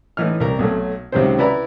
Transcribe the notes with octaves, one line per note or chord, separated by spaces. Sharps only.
A2 E3 D#4 F6
C2 A#4
B1 F#3 A3
C#2 C3 D#3 F#3 C4 C5
E4 B4 D5 A#5